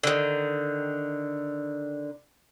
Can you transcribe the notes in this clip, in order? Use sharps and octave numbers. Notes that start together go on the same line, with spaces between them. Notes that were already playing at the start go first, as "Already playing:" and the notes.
D3 D#3